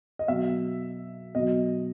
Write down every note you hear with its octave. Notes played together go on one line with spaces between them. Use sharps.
D#5
B2 F#3 E5
B2 F#3 D#5